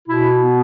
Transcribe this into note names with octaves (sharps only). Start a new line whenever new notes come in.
B2 E4
B3